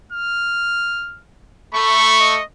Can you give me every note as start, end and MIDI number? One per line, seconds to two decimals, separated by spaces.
0.12 1.21 89
1.74 2.38 57
1.74 2.16 83
1.74 2.38 85
2.20 2.44 75